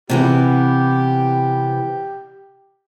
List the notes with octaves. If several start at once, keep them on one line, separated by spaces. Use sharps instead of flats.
C3 E3 B3 G4